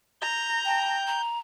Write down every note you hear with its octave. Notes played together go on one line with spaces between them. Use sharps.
A#5 G6
G5 A5
A#5